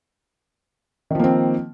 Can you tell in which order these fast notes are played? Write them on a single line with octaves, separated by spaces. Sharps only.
D#3 F3 A#3 C4